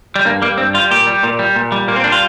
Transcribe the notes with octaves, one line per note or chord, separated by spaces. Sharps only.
G3
G2 A#3
G3 A#3
G2 C4
G3 F4
A#2 G4
G3
A#2
G3
A#2
G3
A#2 A#3
C4
G3 D4
F4